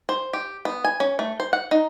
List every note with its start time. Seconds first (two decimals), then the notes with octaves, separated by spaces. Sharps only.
0.09 C5
0.33 G4
0.65 B3
0.84 G#5
1.00 C#4
1.19 A3
1.40 C5
1.53 F#5
1.71 D#4